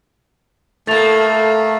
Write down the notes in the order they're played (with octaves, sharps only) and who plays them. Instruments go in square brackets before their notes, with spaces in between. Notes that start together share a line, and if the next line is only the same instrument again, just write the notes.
[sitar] A2 A#3 [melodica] A3 [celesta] A4 A6 F7